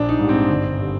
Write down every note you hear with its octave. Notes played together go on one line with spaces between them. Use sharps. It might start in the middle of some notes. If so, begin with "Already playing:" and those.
Already playing: A#1 D4
D#4
G#2 G3
C4
G1
D3 G3